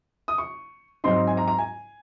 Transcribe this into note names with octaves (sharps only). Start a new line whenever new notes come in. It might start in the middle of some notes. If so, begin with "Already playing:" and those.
D#6
C#6
G#2 F#3 C4 D#4 C6
G#5
A#5
A#5
G#5